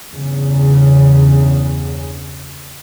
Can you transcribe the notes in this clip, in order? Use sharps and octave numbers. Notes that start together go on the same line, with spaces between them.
E2 G2 C#3